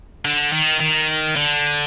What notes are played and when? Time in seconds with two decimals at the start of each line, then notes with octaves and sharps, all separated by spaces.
0.25 D3
0.52 D#3
0.80 D#3
1.36 D3